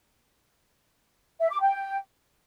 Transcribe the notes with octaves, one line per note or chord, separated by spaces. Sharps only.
E5
D6
G5